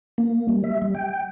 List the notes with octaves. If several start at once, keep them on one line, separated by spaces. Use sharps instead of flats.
A#3
G3
E5
G3
G5